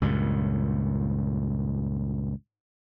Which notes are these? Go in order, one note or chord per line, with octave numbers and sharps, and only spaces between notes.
C#2 G2 A#2